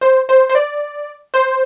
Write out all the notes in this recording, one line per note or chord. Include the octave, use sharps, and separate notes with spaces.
C5
C5
C5
D5
C5